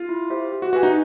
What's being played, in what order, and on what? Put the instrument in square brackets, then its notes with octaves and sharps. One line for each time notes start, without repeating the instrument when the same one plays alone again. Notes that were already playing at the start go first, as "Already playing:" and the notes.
Already playing: [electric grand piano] F4
[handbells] E4
G4 C5 E5
G4
[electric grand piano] F#4
[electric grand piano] F#4 [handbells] B4 E5 G#5
[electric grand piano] D#4